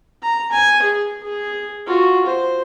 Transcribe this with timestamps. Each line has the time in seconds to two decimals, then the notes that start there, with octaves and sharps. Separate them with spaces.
0.22 A#5
0.52 G#5
0.83 G#4
1.23 G#4
1.87 F4 F#4
2.26 C5